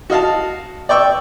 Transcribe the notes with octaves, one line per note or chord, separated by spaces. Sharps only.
F#4 D#5 F5 A5
D5 G5 C#6 E6